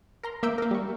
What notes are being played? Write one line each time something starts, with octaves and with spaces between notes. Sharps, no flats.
A#4 A#5 C6
A#3 E5 D6 E6 G6 D7
A#3 A#4
G3 C#6